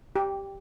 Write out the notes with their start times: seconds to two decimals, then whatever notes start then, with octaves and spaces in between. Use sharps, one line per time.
0.16 G4